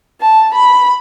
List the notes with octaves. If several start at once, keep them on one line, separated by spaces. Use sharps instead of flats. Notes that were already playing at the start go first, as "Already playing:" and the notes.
A5
B5